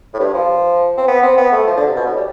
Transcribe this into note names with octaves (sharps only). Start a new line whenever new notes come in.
A2
G2
F3
C4
B3
C4
B3
A3
F3
D3
C3
B2
A2
G3